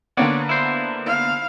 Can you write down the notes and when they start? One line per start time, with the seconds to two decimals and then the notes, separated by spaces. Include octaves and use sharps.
0.17 D3 A#3 B3 D4 C#5 D5
0.49 E4 C5
1.07 F5